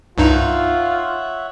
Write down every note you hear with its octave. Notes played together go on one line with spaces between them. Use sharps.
C2 G2 D#4 F4 C#5 E5 F#5